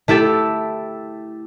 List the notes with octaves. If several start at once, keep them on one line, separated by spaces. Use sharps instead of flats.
A3 E4 G4 A4